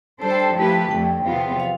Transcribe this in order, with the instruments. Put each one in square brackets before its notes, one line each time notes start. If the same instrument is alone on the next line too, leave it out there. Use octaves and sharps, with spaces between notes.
[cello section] G3 D4 A4 C5 [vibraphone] A5
[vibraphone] G5
A5
[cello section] F3 A3 E4 G4 B4
[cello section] F2 D3 A3 [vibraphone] G5
[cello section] E2 C3 F3 B3 F4
[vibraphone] F5